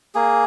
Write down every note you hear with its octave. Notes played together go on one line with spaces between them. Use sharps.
A#3 G#4